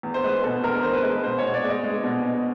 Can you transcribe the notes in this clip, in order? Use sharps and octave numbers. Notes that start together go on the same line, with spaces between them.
E2
C5
G#3 B4
B2 A4
E2 A#4
E2 C5
B4
G#3
B4
B2 C5
B2 C#5
D5
G#3
D#5
G#3
B2
B2